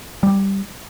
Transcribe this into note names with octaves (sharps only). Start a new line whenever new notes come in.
G3